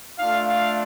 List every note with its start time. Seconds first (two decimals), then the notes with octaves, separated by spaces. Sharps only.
0.17 A3 D4 F4 F5
0.47 F5